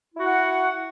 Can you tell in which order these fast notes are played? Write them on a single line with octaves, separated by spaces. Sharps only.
E4 F#4 F#5